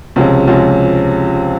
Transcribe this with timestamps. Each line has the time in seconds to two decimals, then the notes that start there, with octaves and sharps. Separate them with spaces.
0.16 C#2 C3 F3 G#3 C#4
0.47 C#2 C3 F3 G#3 C#4